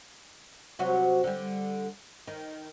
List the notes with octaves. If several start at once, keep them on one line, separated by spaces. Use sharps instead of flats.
C3 F#3 F#4
D3 G3
D#3